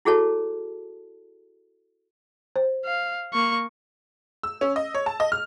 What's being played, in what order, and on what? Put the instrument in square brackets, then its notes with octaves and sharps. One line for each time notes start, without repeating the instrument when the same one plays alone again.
[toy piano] E4 F#4 G#4 A4 C#5 A5
[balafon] C5
[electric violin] F5
A#3 C#6
[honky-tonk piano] E6
C#4
D#5
C#5
A5
D#5
F6